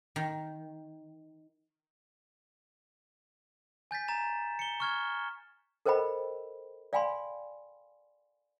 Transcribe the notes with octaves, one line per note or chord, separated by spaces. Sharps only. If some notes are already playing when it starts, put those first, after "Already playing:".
D#3
G#5 G6 A6 B6
A#5 A6 E7
C#7 G7
C#6 F6 G#6
A4 A#4 C5 D#5 G5 B5
D5 F5 G5 G#5 B5 C6